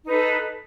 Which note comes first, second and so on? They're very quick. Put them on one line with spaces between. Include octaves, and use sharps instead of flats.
D#4 B4 A4